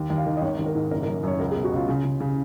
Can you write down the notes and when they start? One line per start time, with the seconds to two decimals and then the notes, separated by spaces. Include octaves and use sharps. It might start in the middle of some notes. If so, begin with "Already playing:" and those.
Already playing: D#2
0.10 D#2
0.18 F5
0.26 D#3
0.37 D#5
0.42 G#1 C#5
0.58 G#1
0.66 A#4
0.75 G#2
0.91 F#1 A#4
1.03 A#4
1.08 F#2
1.23 F#2 C#5
1.40 C#2 A#4
1.51 G#4
1.56 B2
1.64 F#4
1.72 C#2 F4
1.89 C#3
2.05 C#3
2.20 C#3